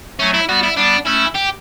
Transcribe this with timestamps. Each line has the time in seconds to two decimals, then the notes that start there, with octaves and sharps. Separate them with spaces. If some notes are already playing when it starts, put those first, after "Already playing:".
0.20 F#3 A3 C#4
0.34 E4
0.48 G3 B3 F#4
0.63 E4
0.76 G3 B3 D4
1.05 A3 C#4 E4
1.35 G4